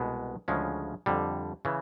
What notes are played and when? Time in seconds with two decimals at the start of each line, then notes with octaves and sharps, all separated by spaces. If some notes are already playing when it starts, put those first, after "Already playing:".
Already playing: C2 B2 G#3 B3
0.48 D2 C#3 F3 G#3 C#4
1.06 F2 D3 G3
1.65 C#3 E3